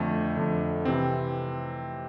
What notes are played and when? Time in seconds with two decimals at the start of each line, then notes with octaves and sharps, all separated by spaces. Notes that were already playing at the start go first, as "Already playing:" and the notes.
Already playing: F2 D3 A3
0.37 F2 D3
0.85 C3 E3 C4